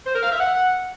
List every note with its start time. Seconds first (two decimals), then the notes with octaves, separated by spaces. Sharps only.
0.06 C5
0.15 A#4
0.23 F5
0.32 E5
0.40 F#5